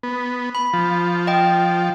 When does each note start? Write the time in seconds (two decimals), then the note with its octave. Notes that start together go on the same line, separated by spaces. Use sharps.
0.03 B3
0.55 B5
0.73 F3
1.27 D#5 G5